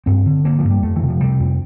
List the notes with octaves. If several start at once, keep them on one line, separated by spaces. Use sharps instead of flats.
G2 C4
D3
D3 A#3
F3
G2
G3
F2 A3
E3
C3
F3
C3 G3
F2